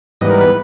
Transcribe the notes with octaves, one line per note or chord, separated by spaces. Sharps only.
G#2 E3 G3 B3 D#5
A#4
B4